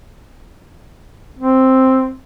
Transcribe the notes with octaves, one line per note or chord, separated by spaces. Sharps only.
C4